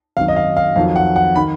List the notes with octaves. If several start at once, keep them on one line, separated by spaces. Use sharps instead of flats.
G#1 F#2 D#3 F5
D#5
F5
F5
F2 D#3 F#3 F5
F#5
F#5
D#3 B5